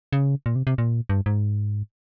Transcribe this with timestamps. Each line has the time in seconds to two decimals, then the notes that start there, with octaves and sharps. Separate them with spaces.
0.13 C#3
0.46 A#2
0.56 C3
0.67 C3
0.78 A#2
1.09 G2
1.26 G#2